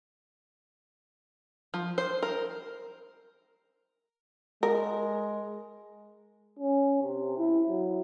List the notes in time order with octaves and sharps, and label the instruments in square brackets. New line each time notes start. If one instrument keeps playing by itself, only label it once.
[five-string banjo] F3
C5
A#4
[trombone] G#3 [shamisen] A#4
[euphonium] C#4
C3
E4
F#3